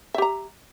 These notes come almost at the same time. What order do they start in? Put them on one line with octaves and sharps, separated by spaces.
E5 G4 A#5